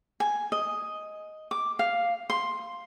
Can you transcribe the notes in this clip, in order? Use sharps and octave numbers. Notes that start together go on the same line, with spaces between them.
G#5
D#5
D6
F5
C6